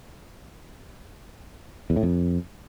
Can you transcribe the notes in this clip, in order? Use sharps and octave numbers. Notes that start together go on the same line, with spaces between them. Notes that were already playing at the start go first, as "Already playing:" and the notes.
E2
A2
F2